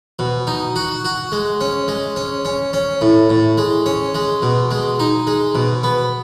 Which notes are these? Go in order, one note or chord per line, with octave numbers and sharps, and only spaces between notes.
B2
D#4
F#4
F#4
G#3
C#4
G#3
C#4
C#4
C#4
A2
A2
G#3
C#4
G#3
B2
G#3
D#4
G#3
B2
B3